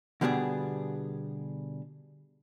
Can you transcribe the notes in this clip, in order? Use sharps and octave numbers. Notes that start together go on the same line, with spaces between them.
B2 D3 G3 B3 D4 G#4